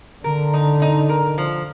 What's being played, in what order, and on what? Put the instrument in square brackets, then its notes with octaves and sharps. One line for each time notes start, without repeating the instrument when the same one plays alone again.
[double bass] D3 [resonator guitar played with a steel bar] A#4
[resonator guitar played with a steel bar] D#4
D#4
A#4
F3